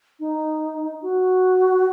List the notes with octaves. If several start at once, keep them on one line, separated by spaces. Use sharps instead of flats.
D#4
F#4